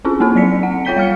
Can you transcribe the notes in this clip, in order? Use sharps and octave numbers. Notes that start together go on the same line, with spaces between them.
C4 C#4 E4 F4 G#4
A#3 C4 D#4 A4
F#3 C4 D5 B6 C#7
C4 F#5
F4 C#5 G5 G6 B6 G7
G3 F5 F6 C#7